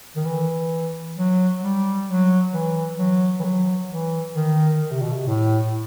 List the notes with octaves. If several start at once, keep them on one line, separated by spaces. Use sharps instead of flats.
D#3
E3
F#3
G3
F#3
E3
F#3
E3
F#3
E3
D#3
D#3
C3
B2
C3
A2